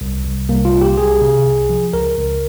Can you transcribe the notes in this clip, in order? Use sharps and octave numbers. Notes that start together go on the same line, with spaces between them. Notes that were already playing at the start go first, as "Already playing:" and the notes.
C2
C2
C2 A#3
F4
C2
G4
C2 G#4
C3
C2
F3
C#2 A#4
C#2